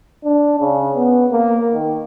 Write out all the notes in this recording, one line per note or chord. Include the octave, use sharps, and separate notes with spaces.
D4
C#3
B3
A#3
D#3